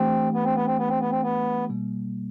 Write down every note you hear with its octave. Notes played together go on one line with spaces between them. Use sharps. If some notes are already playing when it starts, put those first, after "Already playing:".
Already playing: E3 A3 C4 D4 G4
B3
C4
B3
C4
B3
C4
B3
C4
B3
B2 G3 A#3